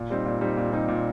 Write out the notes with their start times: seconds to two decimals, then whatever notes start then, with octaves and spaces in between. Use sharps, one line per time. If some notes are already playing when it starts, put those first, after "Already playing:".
Already playing: A#2
0.10 G3 C4 D#4
0.26 A#2
0.41 G3 C4 D#4
0.57 A#2
0.73 G3 C4 D#4
0.88 A#2